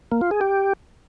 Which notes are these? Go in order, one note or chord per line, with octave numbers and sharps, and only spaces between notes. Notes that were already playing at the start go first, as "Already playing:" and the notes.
A#3
F4
G#4
G4